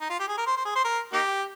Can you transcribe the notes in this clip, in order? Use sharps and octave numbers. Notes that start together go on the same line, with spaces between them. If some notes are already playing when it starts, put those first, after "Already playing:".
D#4
F4
G4
G#4
A#4
C5
C5
G#4
C5
A#4
A#3 D#4 G4